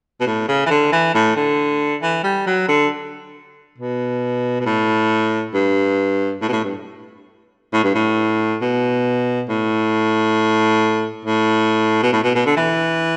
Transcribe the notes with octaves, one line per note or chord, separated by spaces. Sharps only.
B2
A2
C#3
E3
D3
E3
A2
D3
E3
G3
F#3
D3
B2
B2
A2
G2
A2
B2
A2
G2
A2
G2
A2
B2
A2
A2
B2
A2
B2
B2
D3
E3